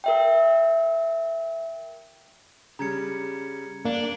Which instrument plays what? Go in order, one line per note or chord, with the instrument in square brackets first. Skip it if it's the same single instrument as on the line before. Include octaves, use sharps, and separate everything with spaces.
[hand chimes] A#4 E5 G5
[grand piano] C#3 G3 [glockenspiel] A#5 G#6 C#7
[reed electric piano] A#3 [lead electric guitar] D4